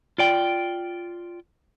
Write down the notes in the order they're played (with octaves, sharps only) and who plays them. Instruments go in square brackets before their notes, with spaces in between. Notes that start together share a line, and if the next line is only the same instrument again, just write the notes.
[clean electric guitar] F4 D5 G5